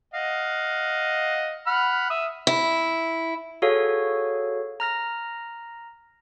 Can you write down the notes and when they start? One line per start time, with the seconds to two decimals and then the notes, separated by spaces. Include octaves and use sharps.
0.14 D#5 F5 F#5
1.67 F#5 B5 F6
2.10 E5 D#6
2.47 E4
3.62 F#4 G#4 A4 C#5 F5
4.80 A#5 F6 A#6